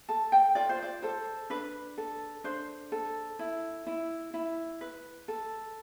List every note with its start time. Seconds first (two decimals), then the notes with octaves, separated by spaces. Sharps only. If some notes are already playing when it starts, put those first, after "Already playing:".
0.09 A4 A5
0.32 G5
0.55 F4 D5
0.69 C5
0.83 D5
1.02 A4 C5
1.50 D4 B4
1.97 A4
2.44 D4 C5
2.92 A4
3.39 E4
3.87 E4
4.34 E4
4.81 B4
5.28 A4